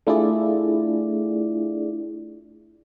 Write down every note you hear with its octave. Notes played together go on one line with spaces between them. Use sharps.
A3 D4 E4 F4 G#4 D5